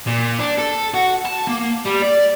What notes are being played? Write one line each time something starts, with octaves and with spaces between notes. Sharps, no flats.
A#2
D4
A4
F#4
A5
A#3
G3
D5